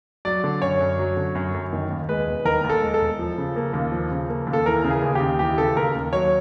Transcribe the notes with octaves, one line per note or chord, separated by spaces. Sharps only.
F#3 D5
D3
F#2 C#5
F#2
F#3
D3
F#2
F#2
D#3
D#2
G#3 B4
E1
D#3 A#4
D#2
A4
G#3
A4
E1
F3
C#3
A#3
D#2
F3
C#3
A#3
D#2
A4
E3 A#4
C#3
G#4
D#2
G4
D#2
E3 G4
C#3 A4
D#2 A#4
D#2
F#3 C#5